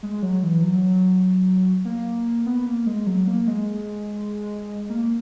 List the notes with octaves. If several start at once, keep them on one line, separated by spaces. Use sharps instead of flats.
G#3
F#3
E3
F#3
A#3
B3
A#3
G#3
F#3
A#3
G#3
A#3